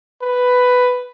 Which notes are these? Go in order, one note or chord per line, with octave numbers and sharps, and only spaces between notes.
B4